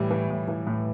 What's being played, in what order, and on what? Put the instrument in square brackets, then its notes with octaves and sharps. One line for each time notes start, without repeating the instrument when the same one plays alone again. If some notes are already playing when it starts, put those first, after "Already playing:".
Already playing: [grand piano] A2 E3 G3
E3
A2
E3
A2